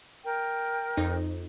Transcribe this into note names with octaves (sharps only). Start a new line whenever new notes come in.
A#4 G5
F2 D#4